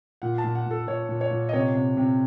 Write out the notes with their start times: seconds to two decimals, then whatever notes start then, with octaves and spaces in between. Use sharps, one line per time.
0.22 A#2 F#5
0.38 A5
0.44 A#2
0.55 F#5
0.66 A#2 A4
0.87 A#2 C#5
1.09 A#2
1.21 C#5
1.31 A#2
1.49 D#5
1.53 C3 C#5
1.75 C3
1.97 C3